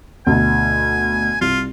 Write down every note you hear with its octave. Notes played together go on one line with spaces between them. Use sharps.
D2 B2 G#5
C2 F4